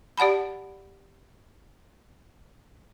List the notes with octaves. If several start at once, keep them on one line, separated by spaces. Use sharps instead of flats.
G4 D5 F#5 A5 B5